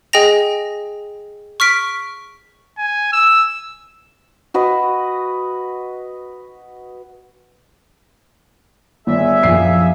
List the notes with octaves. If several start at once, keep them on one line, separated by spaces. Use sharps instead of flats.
G#4 D#5 G5 G#5 A#6 F7
C#6 F6 B6 D7
G#5
E6
F#4 B4 D#5
G1 G#4 D5 E5 G#5
A#1 F#2 F3 C7